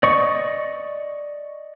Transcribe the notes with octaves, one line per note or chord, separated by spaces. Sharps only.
D5 D#5 C#6